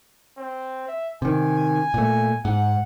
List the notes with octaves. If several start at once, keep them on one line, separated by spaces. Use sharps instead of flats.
C4
E5
C3 D#3 G#5
A#2 A3
G#2 F#5